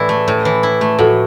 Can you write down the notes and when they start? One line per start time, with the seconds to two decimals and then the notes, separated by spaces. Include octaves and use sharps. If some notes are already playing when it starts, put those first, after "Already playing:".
Already playing: A2 E3 E4 D5
0.09 A3
0.28 A2
0.45 E3
0.63 E4
0.81 A3
0.99 A2 F#4 A4